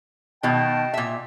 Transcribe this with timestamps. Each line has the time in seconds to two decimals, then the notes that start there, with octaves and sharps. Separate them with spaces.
0.43 B2 D#3 D#5 G5 A5
0.94 A#2 E5